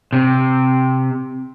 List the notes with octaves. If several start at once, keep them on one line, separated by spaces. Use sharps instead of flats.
C3